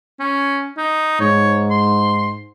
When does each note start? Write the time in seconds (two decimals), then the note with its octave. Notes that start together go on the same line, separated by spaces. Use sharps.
0.19 C#4
0.77 D#4
1.20 G#2 C#5
1.70 C6